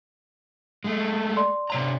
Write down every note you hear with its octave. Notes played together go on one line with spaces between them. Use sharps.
G#3 A3
D5 C6
C3 C#5 A#5